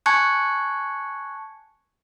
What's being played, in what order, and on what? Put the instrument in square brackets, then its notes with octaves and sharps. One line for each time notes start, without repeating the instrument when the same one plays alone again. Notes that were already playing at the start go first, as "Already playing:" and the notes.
[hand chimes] G#5 A5 C#6 F#6 G#6 C#7